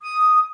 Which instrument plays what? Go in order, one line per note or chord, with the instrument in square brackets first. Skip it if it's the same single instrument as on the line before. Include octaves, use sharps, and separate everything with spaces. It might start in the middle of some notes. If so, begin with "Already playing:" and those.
[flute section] D#6